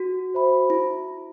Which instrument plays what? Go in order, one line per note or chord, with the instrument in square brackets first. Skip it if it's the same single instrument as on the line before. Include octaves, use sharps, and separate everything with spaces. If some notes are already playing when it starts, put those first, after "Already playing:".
Already playing: [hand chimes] F#4
[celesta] C5 E5 B5
[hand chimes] E4